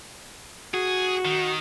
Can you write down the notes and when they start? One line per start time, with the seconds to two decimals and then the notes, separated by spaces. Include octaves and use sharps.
0.74 F#4 G#4
1.25 D#3